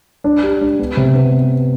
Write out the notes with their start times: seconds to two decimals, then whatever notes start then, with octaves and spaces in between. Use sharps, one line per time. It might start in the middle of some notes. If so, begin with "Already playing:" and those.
0.24 D4
0.43 G4
0.61 D4
0.79 B3
0.97 C3
1.15 B3